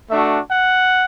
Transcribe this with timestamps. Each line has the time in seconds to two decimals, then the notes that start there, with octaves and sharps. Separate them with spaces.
0.10 A3 D4 F#4 E5
0.51 F#5